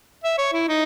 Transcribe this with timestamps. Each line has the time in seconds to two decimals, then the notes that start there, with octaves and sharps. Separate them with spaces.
0.24 E5
0.38 C#5
0.53 E4
0.68 D#4